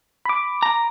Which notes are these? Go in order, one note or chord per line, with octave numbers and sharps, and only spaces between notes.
B5 D6
A#5